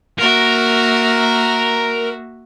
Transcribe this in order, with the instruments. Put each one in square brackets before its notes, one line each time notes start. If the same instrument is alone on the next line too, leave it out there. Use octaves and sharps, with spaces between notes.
[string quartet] A#3 F#4 E5 [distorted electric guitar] A#4